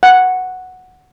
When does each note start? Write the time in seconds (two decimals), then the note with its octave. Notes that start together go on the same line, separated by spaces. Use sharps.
0.03 F#5